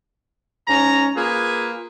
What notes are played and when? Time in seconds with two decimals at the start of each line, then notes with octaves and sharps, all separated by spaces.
0.68 G#2 C#4 A#5
1.16 A#3 F4 G#4 B4